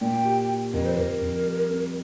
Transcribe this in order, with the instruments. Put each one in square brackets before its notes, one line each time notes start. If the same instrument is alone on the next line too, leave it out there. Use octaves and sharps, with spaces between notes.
[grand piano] A#2 [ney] G5
[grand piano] G4
G4
[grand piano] F2 [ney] A#4
[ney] C5
[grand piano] F2 [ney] A#4
[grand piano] F2
G3
C4